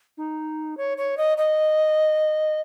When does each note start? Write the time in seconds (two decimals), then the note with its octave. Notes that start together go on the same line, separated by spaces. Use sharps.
0.17 D#4
0.77 C#5
0.98 C#5
1.17 D#5
1.38 D#5